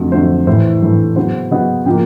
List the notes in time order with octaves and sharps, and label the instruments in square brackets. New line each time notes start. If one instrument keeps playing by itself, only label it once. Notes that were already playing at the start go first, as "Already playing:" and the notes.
Already playing: [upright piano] F2 D3 F#3 A3
F2 D3 F#3 A3 C5
A2 E3 A3 C5
A2 E3 A3
C#3 F#3 B3 C5
C#3 F#3 B3 D#5
C#3 F3 A#3 G5